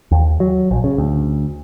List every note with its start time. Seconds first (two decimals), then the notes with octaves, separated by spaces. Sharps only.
0.11 D#2
0.40 F#3
0.71 A#1
0.84 C#3
0.98 D2